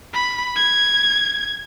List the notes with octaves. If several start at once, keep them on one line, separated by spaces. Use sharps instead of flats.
B5
G#6